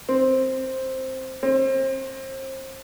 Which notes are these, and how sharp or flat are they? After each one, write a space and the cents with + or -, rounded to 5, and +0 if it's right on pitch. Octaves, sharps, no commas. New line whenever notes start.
C4 +0
C4 +30